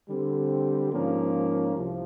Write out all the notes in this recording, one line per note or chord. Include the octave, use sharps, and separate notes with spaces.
D3 G3 C4
G#2 F3 A#3 C#4
C2 C3 F3